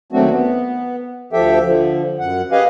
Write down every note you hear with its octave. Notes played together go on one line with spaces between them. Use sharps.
D#2 F#3 A3 C4 D4 F#4
B3
D2 F3 G4 A4 E5 G5
D3 F3
F#2 F#5
G4 G#4 B4 D#5 F5 G#5